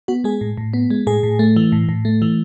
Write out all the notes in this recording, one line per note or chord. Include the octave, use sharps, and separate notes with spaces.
B3 F#4
G#3 G#4
A2
A2
B3
G#3
A2 G#4
A2
A3
E3
A2
A2
A3
E3